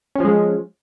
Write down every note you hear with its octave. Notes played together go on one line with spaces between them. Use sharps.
F3 G#3 C#4